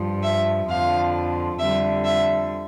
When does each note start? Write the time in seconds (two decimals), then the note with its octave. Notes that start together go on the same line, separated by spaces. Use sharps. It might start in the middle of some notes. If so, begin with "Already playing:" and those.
Already playing: G2 F3
0.23 E5
0.68 F2 D3 F3 F5
1.59 F2 D3 G3 E5
2.05 E5